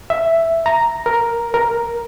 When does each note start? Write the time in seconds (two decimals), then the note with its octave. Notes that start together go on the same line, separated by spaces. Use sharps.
0.10 E5
0.66 A#5
1.06 A#4
1.54 A#4